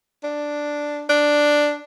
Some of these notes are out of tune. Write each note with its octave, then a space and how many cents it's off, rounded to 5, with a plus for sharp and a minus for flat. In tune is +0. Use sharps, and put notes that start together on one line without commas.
D4 +0
D4 +5